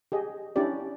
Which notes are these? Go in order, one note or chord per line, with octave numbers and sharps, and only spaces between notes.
G4 G#4 D#5
C#4 D4 E4 G4 D5